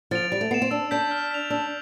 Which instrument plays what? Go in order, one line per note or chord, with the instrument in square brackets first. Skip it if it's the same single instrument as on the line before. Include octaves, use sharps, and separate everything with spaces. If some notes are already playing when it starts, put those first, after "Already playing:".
[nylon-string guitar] F3 [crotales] A6 D7 F7
[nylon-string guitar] G3 [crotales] A6
[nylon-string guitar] A3
[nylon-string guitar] B3 [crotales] C7 E7
[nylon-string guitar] C4
[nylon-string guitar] D4 [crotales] E6
[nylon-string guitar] D4 [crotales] G6 B6
[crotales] F6
B6 F7
[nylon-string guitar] D4 [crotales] E6